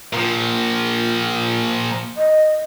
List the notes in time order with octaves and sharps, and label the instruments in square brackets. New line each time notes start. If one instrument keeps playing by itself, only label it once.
[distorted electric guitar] A#2 F3
[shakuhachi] D#5